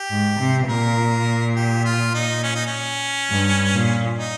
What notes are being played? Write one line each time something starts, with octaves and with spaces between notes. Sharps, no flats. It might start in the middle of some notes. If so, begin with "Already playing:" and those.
Already playing: G4
G#2
C3
A#2 A#4
G4
F4
D#4
C#4
D#4
C#4
G2
A#2
D#4